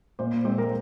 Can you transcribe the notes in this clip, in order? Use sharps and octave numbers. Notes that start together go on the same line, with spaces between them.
A#2 C5
G#3 C4 C5
A#4